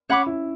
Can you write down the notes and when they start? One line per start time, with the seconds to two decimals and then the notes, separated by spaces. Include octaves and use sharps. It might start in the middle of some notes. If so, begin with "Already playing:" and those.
0.09 C#4 C#5 F#5 B5 D6
0.26 E4